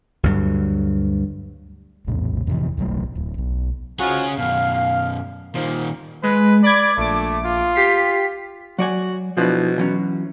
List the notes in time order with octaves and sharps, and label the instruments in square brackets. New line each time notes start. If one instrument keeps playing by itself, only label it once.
[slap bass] D2 G2 F#3
[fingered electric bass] A#1 E2 A2
F2 C3 D#3 E3
D1 B1 F#3 A3
D1
B1
[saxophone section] G#2 F4 F#4 [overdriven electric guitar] C#4 G#4
[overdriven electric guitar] F#2 B2 [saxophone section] F5
[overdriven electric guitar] A#2 D#3 [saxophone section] F3 A#3
[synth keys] G#3 [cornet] B4
[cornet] D5 [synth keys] B5 D6 G#6
[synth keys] A#1 D6 [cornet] A3
[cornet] F4
[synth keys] G4 B6 C7
[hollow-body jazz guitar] F#3 D5 G#5 [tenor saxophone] F#4
[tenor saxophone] B2 [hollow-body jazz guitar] F3 D4 E4
[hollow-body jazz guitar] E3 F#3 C#4